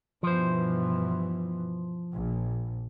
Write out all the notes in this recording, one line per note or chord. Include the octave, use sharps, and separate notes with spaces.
G2 B2 E3 F3 C5
A#1